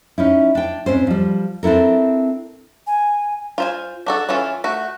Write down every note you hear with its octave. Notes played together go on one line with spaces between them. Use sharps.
C#4 D#4 E4
D4 G5
G#2 C4 C#4 C5
F3 G3
C4 D4 E4 A4 A#4
G#5
F4 C5 G#5
D4 F#4 A4
E3 C#4 F4 A4
A3 F#4